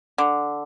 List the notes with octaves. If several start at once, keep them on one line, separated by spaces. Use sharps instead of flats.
D3